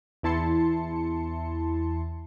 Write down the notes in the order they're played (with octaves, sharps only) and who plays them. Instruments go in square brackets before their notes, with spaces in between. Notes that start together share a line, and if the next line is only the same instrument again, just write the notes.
[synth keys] E2 E4 A5 C6 C#7